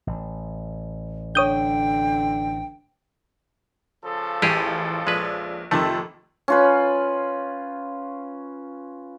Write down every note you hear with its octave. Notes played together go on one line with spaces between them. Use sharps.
A1
D3 C#5 G5 D#6 G6
C#3 F3 A4
A1 G4 G#4
A#1 G#3 B4
F2 C3 D#3 A3 A5
C#4 F4 B4